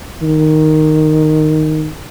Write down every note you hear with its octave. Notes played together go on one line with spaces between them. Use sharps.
D#3